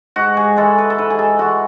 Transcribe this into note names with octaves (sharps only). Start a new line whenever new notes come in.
G#2 F#4
G#4
E3 G#3 A4
B4
A4
G#2 B4
G#4
A4
E3 G#3 F#4